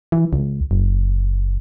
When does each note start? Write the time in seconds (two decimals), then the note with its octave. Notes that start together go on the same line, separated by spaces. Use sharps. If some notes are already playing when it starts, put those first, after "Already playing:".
0.12 E3
0.33 C#2
0.71 F#1